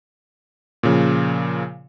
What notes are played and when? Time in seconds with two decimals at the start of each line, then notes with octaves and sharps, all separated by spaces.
0.83 A#2 C#3 F3